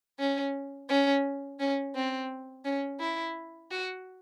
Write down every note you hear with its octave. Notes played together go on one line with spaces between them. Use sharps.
C#4
C#4
C#4
C4
C#4
E4
F#4